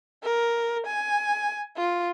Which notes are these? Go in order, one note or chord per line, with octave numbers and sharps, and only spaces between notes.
A#4
G#5
F4